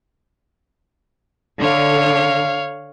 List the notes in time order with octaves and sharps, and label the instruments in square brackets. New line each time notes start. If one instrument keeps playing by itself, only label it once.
[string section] D3 [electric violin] C#5 F5